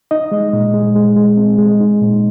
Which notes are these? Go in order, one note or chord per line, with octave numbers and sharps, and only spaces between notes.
D#4 D#5
G#3
A#2
G#3
G#3
G#3
C4
G#3
D#4
A#2